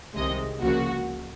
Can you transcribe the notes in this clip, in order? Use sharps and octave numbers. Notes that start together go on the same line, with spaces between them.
C2 C3 D#3 G#3 D#5
C#2 C#3 F3 A#3 F#4